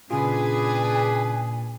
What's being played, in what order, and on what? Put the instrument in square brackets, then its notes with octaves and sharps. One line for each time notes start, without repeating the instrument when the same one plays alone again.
[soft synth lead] A#2 [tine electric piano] C#3 C#4 F4 [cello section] D4 G#4 B4 [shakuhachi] G#5